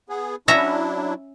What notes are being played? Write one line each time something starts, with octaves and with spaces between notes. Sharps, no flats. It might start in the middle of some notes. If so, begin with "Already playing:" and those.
B3 G#4
F#3 C#4 D4 E4 E5 A#5